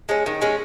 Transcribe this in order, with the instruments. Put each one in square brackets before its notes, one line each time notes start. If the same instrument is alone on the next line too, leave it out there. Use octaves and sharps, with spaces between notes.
[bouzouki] G#3 C#4
D#3
G#3 C#4